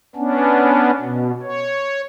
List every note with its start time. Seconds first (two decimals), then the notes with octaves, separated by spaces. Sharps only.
0.16 B3 C#4 D4
1.01 B2
1.42 C#5